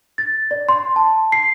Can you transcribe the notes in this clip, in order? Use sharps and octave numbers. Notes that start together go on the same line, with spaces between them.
A6
D5
C6
A5
C7